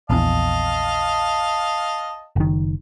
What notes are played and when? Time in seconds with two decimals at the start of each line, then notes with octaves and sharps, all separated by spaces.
0.10 A#1 E2 D#5 F5 A5
2.36 F#1 D#3